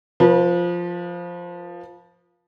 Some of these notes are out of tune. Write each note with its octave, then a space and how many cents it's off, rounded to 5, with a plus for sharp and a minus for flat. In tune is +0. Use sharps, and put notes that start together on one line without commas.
F3 +0 B4 -40